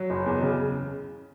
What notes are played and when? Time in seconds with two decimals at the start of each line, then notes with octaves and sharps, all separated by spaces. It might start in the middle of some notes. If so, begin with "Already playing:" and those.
Already playing: F#3
0.10 F#1
0.26 E2
0.43 C#3